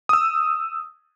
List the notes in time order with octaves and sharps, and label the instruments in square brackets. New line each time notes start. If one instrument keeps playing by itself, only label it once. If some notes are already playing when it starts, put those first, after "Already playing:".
[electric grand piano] D#6 E6